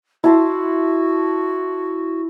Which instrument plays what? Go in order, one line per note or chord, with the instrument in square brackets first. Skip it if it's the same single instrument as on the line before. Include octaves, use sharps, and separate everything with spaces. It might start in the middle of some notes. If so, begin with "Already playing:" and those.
[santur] E4 A5 C6 [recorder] F#4